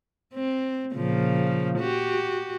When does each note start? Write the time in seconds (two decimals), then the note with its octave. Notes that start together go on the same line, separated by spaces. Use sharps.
0.34 C4
0.95 A#2 C#3 F3
1.79 F#4 G4